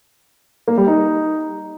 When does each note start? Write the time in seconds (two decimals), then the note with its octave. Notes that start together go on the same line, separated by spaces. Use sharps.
0.68 A#3
0.77 G3
0.87 D#4